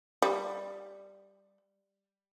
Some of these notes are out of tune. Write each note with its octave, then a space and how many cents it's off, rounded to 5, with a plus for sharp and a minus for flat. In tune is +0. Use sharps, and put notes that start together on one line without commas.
G3 +5